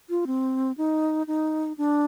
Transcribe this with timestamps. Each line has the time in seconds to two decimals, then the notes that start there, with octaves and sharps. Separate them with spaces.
0.10 F4
0.27 C4
0.78 D#4
1.27 D#4
1.78 D4